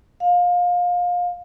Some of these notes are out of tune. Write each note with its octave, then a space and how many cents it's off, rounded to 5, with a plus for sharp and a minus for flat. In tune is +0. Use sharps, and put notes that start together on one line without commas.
F5 +25